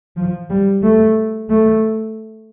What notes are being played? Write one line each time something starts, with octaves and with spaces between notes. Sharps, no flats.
F3
G3
A3
A3